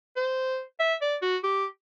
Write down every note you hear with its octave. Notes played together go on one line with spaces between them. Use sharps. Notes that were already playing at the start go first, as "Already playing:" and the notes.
C5
E5
D5
F#4
G4